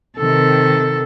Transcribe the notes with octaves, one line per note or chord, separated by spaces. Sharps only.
C3 D#3 A4